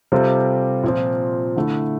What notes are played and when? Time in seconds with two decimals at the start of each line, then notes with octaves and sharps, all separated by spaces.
0.12 C3 G3 C4 F4 A4
0.83 A#2 F3 C4
1.56 D3 A3 E4